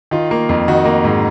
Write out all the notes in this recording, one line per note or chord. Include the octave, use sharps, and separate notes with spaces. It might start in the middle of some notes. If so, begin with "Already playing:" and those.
D#3 F4
A#3
F2
D#3 F#4
A#3
G#2